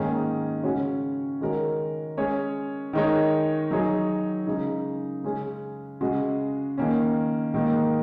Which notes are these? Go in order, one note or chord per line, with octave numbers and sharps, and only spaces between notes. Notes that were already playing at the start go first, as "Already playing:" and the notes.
Already playing: G#2 D#3 A#3 C#4 G#4
C#3 G#3 C#4 F#4 C#5
D#3 G#3 F#4 A#4 C#5
G#3 C#4 G#4 C#5
D#3 G#3 D#4 A#4 C#5
F#3 D#4 G#4 C#5
C#3 G#3 D#4
C#3 G#3 C#4 G#4
C#3 G#3 F#4 D#5
D#3 A#3 C#4
G#2 D#3 A#3